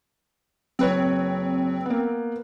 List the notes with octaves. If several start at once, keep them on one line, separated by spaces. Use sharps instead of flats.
F#1 C4 B4 C#5
A#3 B3